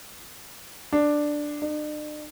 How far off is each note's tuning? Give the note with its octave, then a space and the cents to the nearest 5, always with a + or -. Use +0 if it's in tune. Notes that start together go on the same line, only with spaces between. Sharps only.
D4 +5
D4 +45